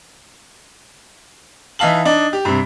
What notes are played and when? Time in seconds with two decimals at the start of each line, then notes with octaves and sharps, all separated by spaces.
1.79 E3 D#4 E5 F5 A5 F#7
2.05 D4 D#4
2.33 G4
2.45 G2 C3